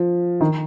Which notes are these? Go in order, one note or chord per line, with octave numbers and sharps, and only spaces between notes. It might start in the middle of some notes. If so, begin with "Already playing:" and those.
Already playing: F3
D#3